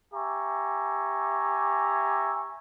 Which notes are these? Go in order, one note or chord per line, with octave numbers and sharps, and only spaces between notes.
G4 E5 G#5 A#5 C#6